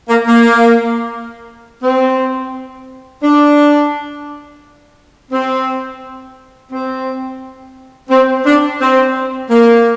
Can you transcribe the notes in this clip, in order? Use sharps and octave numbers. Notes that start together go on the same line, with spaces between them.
A#3
A#3
C4
D4
C4
C4
C4
D4
C4
A#3